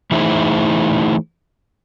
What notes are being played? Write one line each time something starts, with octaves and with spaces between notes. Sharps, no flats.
E3 A3 D#4 E4 G#4 C5